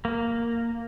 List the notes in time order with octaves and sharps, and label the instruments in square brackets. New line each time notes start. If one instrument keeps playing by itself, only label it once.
[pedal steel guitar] A#3